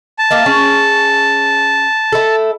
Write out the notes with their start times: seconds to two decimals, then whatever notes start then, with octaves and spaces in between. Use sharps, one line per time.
0.19 A5
0.31 A#3 E5 F5
0.46 C#4 G#4
2.12 E4 A4